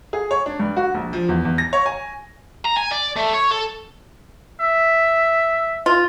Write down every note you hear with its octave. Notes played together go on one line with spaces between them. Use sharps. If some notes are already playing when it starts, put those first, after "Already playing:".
G#4
C#5
D4
G2
F#4
A#1
F3
E2
E2
A#6
C#5
G#5
A#5
G#5
D5
A3
C#5
A4
E5
F4